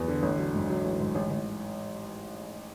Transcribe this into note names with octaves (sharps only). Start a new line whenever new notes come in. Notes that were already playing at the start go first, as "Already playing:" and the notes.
Already playing: E2 F#3 B3
D3
A1
F#3
G#2
F#3
A1
G#2
A1
A1